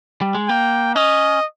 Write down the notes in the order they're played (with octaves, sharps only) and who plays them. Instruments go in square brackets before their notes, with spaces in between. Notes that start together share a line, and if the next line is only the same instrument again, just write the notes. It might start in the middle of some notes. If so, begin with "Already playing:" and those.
[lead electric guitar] G3
G#3
[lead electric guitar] A#3 [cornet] G5
[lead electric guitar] C#4 [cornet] D#5